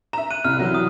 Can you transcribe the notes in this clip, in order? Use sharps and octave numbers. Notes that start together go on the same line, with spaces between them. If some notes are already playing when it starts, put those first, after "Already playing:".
E5 A#5 E7
F#6 D#7
C2 E4 F6
E3 F#3
D#6